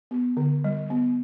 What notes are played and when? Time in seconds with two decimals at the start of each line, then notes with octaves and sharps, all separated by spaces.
0.11 B3
0.37 D3
0.64 G3
0.90 B3